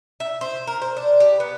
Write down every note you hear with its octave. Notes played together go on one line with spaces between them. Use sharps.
E5
C5
A#4
C5
D4
G4
B3